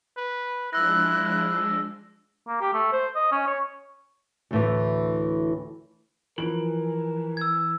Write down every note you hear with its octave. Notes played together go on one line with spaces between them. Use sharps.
B4
F3 G#3 D4 E4 E6 F#6 A#6
A#3
G4
A3
C5
D#5
C#4
C#5
D2 A2 E3
E3 F3 A#4 D7 F#7
E6 G#6